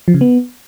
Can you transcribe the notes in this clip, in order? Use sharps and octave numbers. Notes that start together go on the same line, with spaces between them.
F3
C#3
B3